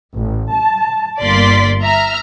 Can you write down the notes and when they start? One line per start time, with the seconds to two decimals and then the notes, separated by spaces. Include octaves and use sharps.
0.15 A1
0.52 A5
1.22 G1 A#3 D5 C6 B6
1.83 E5 A#5 F6